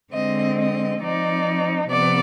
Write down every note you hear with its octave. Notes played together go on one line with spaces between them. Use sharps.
D3 G#3 C4 D#5
D#5
F3 C4 D#4 D5
C3 F3 B3 D5